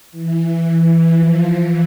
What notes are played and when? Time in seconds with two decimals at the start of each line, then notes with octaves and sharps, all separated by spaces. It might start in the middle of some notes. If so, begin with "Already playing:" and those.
0.12 E3
0.46 E3
0.80 E3
1.15 F3
1.49 E3